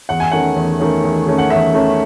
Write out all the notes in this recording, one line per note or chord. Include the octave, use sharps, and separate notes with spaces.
E2 F#5
G#5
D#3 A3 C#4 F#5
E2
D#3 A3 C#4
E2
D#3 A3 C#4
F#5
E2 E5
D#3 A3 C#4